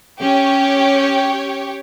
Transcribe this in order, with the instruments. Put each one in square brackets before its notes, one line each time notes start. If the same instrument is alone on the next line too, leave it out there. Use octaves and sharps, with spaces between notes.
[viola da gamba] C#4 [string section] G4 C#5